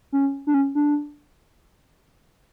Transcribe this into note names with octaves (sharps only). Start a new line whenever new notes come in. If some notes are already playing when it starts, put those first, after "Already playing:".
C#4
D4
C#4
D4